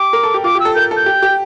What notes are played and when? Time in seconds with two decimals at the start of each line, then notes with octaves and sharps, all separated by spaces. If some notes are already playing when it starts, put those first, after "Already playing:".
Already playing: G4 D6
0.13 A#4
0.23 A4
0.34 G4
0.44 F4 D6
0.55 G4
0.60 E6
0.65 A4
0.75 A#4 G6
0.91 A4
0.96 G6
1.06 G4
1.22 G4